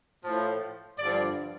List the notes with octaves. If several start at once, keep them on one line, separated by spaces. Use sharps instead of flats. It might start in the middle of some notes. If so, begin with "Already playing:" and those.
A2 F3
G2 D3 F3 D5